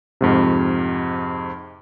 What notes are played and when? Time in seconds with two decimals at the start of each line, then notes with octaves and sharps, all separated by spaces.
0.21 F2 G#2 C3